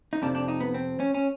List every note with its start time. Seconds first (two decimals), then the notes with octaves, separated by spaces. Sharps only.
0.13 D#4
0.22 F2 C3 F3 D4
0.35 D4
0.48 D#4
0.60 B3
0.74 C4
1.00 C#4
1.15 C#4